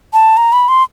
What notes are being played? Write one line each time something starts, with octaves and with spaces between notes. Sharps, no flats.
A5
A#5
B5
C6